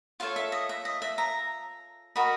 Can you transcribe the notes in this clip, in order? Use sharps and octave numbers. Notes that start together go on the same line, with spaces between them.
F4 A4 C#5 F5
E5
D#5
E5
D#5
E5
A#5
F#4 A#4 D#5 B5